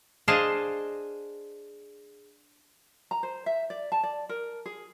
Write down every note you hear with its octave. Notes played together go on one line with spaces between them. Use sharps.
D4 G#4 C5 D#5 F5 A5
A#5
C5
E5
D5
A5
D5
A#4
G#4